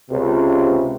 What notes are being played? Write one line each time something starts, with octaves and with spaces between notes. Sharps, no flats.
C#2 C3